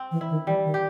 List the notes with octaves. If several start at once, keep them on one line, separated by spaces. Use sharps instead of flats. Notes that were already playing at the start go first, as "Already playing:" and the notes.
Already playing: C4
E3
E4
D#3
E3 G3
D#3
G4